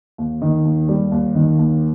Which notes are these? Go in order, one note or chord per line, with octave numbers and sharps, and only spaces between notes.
D#2
D#3
D#2
G3
D#2
D#3
D#2